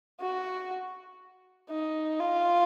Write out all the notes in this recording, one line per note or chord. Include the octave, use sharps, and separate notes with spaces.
F#4
D#4
F4